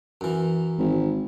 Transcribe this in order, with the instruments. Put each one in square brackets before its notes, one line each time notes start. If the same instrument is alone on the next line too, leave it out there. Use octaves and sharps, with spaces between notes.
[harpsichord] F#2 E3
[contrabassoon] G#1